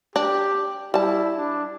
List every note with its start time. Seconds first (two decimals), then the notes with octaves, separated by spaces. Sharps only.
0.16 D4 G4
0.94 G3 E4 A5
1.37 D4